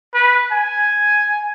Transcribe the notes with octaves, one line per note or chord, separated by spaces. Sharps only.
B4
G#5